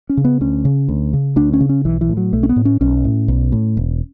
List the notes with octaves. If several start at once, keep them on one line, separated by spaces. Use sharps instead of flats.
C#4
C#3
B3
D2 C#4
C#3
D2
C#3
D2 D4
C#4
C#3
C#4
B1 E3
E3
A2
F#3
B1 A3
C#4
B3
A2
C#4
B1 C#4
A2
B1
A2
E1